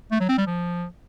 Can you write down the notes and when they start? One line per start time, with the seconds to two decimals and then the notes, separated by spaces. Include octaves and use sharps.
0.11 A3
0.20 F#3
0.29 C4
0.38 G3
0.47 F3